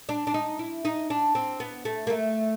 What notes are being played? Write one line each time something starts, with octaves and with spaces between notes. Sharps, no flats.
D4
D4
D#4
E4
D#4
D4
C4
B3
A3
A#3
A3